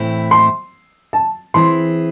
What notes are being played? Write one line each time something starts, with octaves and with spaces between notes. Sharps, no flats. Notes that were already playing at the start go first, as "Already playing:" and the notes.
Already playing: A2 E3 A3 C4 E4
C6
A5
E3 C4 E4 G#4 C6